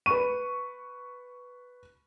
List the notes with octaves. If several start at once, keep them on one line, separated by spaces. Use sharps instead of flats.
B4 C#6 D#7